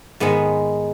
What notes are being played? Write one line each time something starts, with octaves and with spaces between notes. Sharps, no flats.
G#2 D#3 G#3 B3